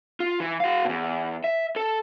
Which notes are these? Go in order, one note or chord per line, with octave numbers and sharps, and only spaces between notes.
F4
E3
F#4 F5
E2 B2
E5
A4 A5